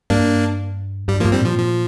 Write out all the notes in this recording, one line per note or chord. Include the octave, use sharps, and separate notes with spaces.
G2 A#3 D4
G2 G3
F3 A#3
G2
G3 C4
A#2 F3
F3